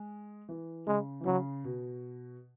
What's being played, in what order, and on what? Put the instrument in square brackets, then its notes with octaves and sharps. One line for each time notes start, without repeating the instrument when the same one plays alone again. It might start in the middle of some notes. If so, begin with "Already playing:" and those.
Already playing: [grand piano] G#3
E3
[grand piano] C#3 [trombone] G#3
[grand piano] E3
[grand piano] C#3 [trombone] F#3
[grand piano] B2